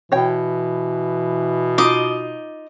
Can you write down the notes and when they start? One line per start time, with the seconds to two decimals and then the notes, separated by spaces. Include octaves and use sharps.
0.12 B2 E3 C#5 G5
1.78 D#4 F4 D#5 D6